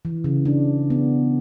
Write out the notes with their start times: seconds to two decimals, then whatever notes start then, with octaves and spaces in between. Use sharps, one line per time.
0.05 E3
0.24 C#3
0.45 D4
0.90 B3